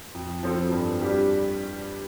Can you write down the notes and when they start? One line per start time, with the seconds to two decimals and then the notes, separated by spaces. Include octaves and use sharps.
0.14 F2
0.43 F3 C4 A4
0.72 G2
1.01 G3 D4 G4